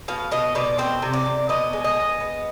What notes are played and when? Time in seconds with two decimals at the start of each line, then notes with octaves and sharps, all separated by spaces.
0.08 B2 F5
0.32 B2 D#5
0.55 B2 D5
0.78 C4 C5
1.02 C3
1.14 D5
1.26 C3
1.49 B2 D#5
1.73 G#3
1.84 D#5
1.96 B3
2.20 B3